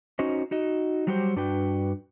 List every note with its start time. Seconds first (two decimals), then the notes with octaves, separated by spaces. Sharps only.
0.19 C#4 D#4 F#4 C5 D#5
0.51 D#4 F#4 D#5
1.07 F#3 G3 F#4 G4 B4 C5
1.36 G2 D4 F#4 B4 G5